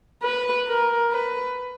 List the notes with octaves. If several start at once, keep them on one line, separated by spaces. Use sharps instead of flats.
B4
A#4
B4